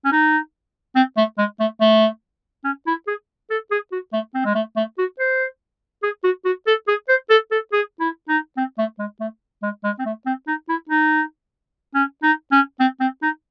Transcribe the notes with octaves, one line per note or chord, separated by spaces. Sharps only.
C#4
D#4
C4
A3
G#3
A3
A3
C#4
E4
G#4
A4
G#4
F#4
A3
C4
G#3
A3
A3
F#4
C5
G#4
F#4
F#4
A4
G#4
C5
A4
A4
G#4
E4
D#4
C4
A3
G#3
A3
G#3
G#3
C4
A3
C4
D#4
E4
D#4
C#4
D#4
C#4
C4
C4
D#4